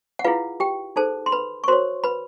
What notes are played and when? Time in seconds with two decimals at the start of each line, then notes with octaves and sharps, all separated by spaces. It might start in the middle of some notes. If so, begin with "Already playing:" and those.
0.19 F#5
0.24 E4 F4 G#4 B4 F5
0.60 G4 G5
0.96 D#4 G#4 A4 C5 A5
1.26 C6
1.32 B4 B5
1.64 C#6
1.68 F#4 A#4 C5 C#5 C6
2.04 B4 B5